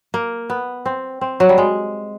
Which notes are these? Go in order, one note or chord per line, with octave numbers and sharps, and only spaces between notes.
A#3
B3
C4
C4
F#3
G3
G#3